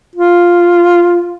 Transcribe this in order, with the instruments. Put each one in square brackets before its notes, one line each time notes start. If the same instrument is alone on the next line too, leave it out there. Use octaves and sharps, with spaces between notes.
[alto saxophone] F4